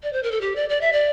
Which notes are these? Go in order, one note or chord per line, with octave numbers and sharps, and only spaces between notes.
D5
C5
A#4
A4
G4
D5
D5
E5
D5